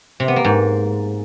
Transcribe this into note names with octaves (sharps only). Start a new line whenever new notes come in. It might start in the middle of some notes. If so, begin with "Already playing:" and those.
C3
B3
A#3
G#2